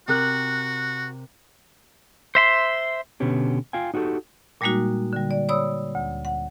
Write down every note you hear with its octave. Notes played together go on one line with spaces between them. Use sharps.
C3 F#4 A#4 F#6
C5 E5 C6
B2 D3 B3 C#4 G4
F4 F5 G5 G#5
D#4 F#4 G4 A4
A#2 G3 G#3 A#3 D#4 F#4
D3 G3
D5
C#5 D5 B5 D#6 E6
D2
F#5